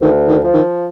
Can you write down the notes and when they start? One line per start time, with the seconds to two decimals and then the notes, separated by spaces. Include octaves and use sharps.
0.01 D2 D#3
0.28 D#3
0.41 F3
0.54 D#3